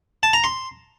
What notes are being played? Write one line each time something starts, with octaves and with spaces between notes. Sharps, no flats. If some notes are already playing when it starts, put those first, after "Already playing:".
A5
A#5
C6